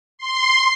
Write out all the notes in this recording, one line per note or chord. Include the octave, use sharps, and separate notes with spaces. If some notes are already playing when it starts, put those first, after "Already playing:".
C6